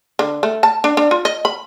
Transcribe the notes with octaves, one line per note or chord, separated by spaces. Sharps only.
D3
A3
A5
D4
D4
F4
D#5
B5